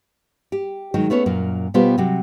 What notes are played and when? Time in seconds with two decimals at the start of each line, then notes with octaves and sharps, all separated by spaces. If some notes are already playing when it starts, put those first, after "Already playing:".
0.52 G4
0.94 D#3 F#3 G#3 D#4
1.10 A3 B3 C#4 C#5
1.26 F#2 A#2 A#4
1.74 B2 G3 B3 F4 G4 C5
1.98 C3 F#3